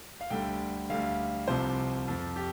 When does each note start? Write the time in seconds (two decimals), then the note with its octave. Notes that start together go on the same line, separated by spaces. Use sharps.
0.21 F5
0.30 D2 D3 G3 G5
0.90 D2 D3 G3 F5
1.48 C2 C3 F3 C5
2.08 F2 F3
2.36 G4